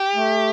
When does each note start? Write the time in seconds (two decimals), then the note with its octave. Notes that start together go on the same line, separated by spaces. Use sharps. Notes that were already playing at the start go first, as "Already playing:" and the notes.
Already playing: G4
0.15 A3